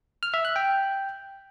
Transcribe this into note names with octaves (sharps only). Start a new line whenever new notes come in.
F6
E5
F#6
G5